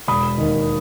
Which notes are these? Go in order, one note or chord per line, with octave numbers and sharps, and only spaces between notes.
E1 B5 D#6
D#2 D#3